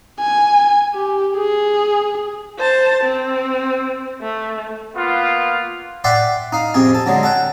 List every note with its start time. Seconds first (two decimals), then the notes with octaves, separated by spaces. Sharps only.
0.20 G#5
0.95 G4
1.37 G#4
2.59 C5 A5
3.04 C4
4.22 A3
4.95 A#3 B3 F4
6.04 D5 E5 F#5 G5 C6
6.52 D#4 F5
6.74 F2 C3 G#4
6.95 A4
7.06 D3 F#3 G#3
7.23 A4 F#5 G5